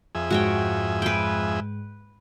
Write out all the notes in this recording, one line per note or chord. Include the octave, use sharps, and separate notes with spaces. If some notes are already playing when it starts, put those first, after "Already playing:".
F2 G#4 E5
G#2 G#3 F#4 C#5 G5
B4 G5